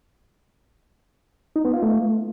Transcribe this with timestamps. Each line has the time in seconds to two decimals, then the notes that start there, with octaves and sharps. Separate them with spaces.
1.56 D#4
1.65 B3
1.74 F4
1.83 A3